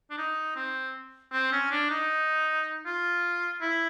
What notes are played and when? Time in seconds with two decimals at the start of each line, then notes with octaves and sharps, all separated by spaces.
0.10 D4
0.18 D#4
0.55 C4
1.32 C4
1.52 C#4
1.71 D4
1.90 D#4
2.85 F4
3.61 E4